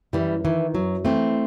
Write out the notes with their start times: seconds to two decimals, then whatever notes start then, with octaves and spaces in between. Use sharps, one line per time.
0.13 F#2 E3 G3
0.45 D#3 E3
0.75 F#2 F#3
1.05 E3 A3 C4